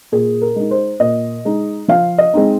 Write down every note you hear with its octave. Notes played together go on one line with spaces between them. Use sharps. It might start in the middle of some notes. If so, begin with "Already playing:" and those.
A#2 G#4
A#4
G#3 D#4
C5
A#2 D#5
G#3 D#4
F3 F5
D#5
G#3 C4 D#4